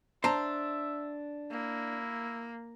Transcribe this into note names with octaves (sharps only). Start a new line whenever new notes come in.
D4 C5 E5 A5 A#5
A#3 E4